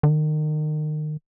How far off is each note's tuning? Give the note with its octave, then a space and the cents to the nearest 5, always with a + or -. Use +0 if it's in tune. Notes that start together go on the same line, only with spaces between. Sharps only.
D#3 -30